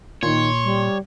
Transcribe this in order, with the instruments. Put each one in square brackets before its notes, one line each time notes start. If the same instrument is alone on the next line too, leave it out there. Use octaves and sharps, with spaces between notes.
[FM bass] A#2 [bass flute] D#3 [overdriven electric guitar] C#5 [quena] C6
[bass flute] G3